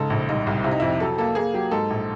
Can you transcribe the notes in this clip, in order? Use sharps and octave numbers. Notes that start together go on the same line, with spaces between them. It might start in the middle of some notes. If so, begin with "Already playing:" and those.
Already playing: G#2 C#3 A4
A#1
C2 D#4
C2
C3 E4
D#4
F2 E4
F#3 A4
A#3 A4
A#3 G#4
F#3 G4
G#2 A4
A#1